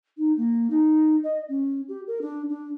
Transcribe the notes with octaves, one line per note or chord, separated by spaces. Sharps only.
D#4
A#3
D#4
D#5
C#4
G4
A#4
D4
D4